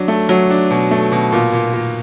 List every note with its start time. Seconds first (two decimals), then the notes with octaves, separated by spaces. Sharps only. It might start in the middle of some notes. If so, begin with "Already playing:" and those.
Already playing: F#3 D4
0.08 A3
0.29 F#3
0.50 D4
0.71 B2
0.91 A3
1.12 B2
1.32 A#2
1.53 A#2
1.74 A#2